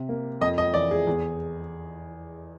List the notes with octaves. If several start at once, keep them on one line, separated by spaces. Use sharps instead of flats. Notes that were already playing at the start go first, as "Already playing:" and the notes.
Already playing: C3
A#3
F2 D#5
D#5
E3 D5
G#4
E2